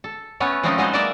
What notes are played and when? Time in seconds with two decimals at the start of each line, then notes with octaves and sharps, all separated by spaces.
0.04 A4
0.40 A3 B3 C#4 C#5
0.63 F3 G#3 A3 C4 C#4 D#4
0.78 F#3 G#3 B3 D#4 F#4 C5
0.93 A#3 A#4 D5 E5 G#5 A5